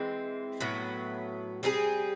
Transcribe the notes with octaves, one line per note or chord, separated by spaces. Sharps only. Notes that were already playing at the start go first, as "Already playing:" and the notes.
Already playing: E3 G#3 C4
A2 F#3 B3
G3 C4 D#4 G#4